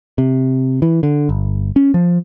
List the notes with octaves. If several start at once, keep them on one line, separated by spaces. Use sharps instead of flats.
C3
E3
D3
G1
C#4
F3